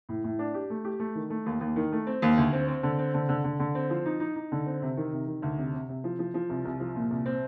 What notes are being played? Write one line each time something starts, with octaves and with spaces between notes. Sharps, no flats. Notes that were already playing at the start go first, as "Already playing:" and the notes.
A2
A2
D4
G4
A3
G4
A3
D#3
A3
D#2
D#2
D#3
A3
C4
D#2
D2
C4
C4
D3
C4
D3
D3
D3
D3
C4
F3
D#4
D#4
D#4
D3
C4
C3
D#3
C3
D#3
D2
C3
C3
C3
F3
F3
F3
C2
C2
F3
A#2
C2
C4